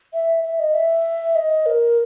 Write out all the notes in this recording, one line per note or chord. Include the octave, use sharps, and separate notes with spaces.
E5
E5
D#5
E5
D#5
A#4